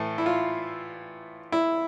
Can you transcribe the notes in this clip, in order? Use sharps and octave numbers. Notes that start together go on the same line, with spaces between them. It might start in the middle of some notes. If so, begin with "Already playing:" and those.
Already playing: A2 E3 A3
E4
F4
E4